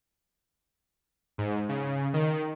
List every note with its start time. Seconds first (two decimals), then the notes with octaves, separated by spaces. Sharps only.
1.38 G#2
1.69 C#3
2.14 D#3